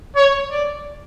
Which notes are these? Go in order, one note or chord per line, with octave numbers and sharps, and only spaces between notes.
C#5
D5